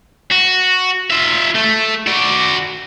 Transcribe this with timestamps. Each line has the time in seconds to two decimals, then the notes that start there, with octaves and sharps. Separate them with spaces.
0.31 F#4
1.11 F4 E5
1.55 A3
2.07 F#4 D5